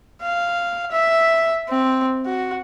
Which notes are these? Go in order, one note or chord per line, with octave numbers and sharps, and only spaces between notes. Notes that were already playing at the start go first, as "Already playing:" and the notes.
F5
E5
C4
F#4